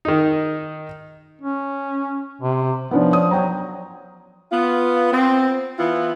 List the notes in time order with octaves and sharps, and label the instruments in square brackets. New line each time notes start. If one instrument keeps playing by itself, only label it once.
[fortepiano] D#3 D#4
[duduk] C#4
C3
[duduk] F3 [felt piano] B3 C#4 D4
[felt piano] C#5 D5 D#6
[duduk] F#3 [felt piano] C#5 G5 A#5
[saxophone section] B3 F4
C4
E3 B3 E4 F4